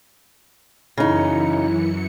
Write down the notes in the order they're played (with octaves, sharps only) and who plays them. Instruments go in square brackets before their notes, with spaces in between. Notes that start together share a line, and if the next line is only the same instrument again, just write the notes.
[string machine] F#2 E3 C#7 [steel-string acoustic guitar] C#3 D#4 [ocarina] E4